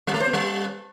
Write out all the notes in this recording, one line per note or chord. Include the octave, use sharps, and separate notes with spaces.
G3
A3
C5
B3
G3